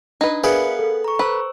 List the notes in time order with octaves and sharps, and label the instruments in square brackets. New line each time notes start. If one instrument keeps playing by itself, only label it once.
[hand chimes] D4 [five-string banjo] D#4 B4
[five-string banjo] B3 [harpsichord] G#4 B4 D5 [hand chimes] A#4 F5 C#7 [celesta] E5
[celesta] A4
[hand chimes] A#5 C#6
[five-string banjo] B4 [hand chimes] C5 E6